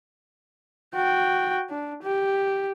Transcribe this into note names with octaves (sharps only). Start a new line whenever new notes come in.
F#4 G5
D4
G4